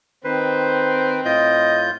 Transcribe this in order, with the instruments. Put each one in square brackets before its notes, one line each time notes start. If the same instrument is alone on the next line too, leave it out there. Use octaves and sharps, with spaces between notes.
[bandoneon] D#3 B4 [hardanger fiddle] C4 [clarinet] C5
[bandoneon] A2 F4 G6 [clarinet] D#5